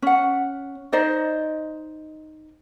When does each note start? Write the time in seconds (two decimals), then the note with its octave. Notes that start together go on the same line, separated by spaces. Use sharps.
0.02 C#4 F#5
0.92 D#4 C5 D5 D#5